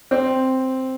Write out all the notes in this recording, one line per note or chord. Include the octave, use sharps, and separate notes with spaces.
C4